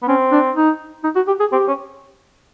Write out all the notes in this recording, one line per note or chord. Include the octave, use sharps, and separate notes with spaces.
B3
C4 C#4
D4
D#4
D#4
F#4
G4
G#4
C4 G4
C#4